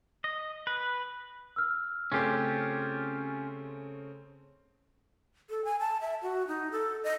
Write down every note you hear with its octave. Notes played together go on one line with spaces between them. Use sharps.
D#5
B4
E6 F6
C#3 A3 C4 C#4 F4 G4
A4
G#5
A5
E5
F#4
D#4
A4
D#5